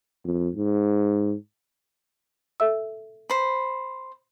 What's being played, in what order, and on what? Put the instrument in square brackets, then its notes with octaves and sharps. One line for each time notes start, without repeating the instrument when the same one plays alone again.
[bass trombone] F2
G#2
[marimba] A4 E5 E6
[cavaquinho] C5 B5